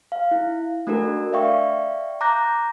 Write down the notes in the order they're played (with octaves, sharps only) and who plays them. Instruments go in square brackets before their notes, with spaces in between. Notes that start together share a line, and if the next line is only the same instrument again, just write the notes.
[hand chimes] F5
E4
A3 D4 F#4 A4 A#4
D5 E5 F5 G5 C#6
A#5 D6 F#6 G6 A#6